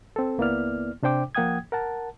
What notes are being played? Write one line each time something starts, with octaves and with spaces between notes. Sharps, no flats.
C4 A4
C#2 A#3 B3 E4 D5 F6
C3 D4 C5 G5 D6
F3 A#3 F#5 G5 D#6 G#6
A#4 F#5 A5